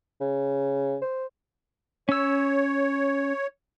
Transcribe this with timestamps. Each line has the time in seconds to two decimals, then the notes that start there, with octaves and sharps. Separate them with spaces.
0.21 C#3
1.02 C5
2.09 C#4 C#5 E6